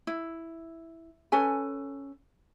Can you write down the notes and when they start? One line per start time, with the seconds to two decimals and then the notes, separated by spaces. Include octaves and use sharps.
0.07 E4
1.32 C#4 A4 B4 G#5